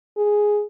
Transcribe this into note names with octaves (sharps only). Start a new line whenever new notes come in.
G#4